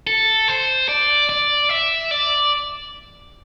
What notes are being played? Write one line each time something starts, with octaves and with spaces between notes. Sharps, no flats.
A4
C5
D5
D5
E5
D5